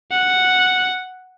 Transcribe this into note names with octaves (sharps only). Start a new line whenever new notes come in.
F#5